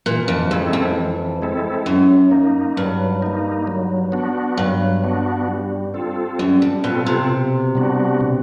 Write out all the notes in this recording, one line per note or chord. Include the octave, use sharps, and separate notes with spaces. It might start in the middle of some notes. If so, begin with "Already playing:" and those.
A#2 E3
F2
F2 G#3 C4 E4 A4
F2
E3
G#3 C4 E4 A4
F#2 F#3
A#3 D#4
G2 F#3
A#3 D#4
F#3
B3 D4 F#4
G2 F#3
B3 D4 F#4
G3
C4 F4 A4
F#2 G3
F2
B2 C4 F4 A4
C3
B2
G3 B3 D4 F#4
B2